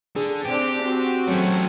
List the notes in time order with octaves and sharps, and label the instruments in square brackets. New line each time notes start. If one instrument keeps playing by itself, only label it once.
[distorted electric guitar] D3 [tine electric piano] G#4
[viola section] C4 D4 [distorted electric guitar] G4
[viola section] C4 F#4
[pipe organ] F#3 [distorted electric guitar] A3 C#4